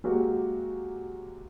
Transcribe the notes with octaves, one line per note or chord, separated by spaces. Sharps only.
F#3 G#3 A#3 F#4 G4